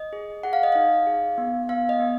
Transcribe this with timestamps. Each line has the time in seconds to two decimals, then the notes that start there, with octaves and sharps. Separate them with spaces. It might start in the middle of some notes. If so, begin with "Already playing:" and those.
Already playing: D#5
0.13 G#4
0.43 G#4 F#5
0.53 F5
0.63 D#5
0.72 D#4 F5
1.07 G#4
1.38 B3
1.69 B3 F5
1.89 D#5
2.00 B3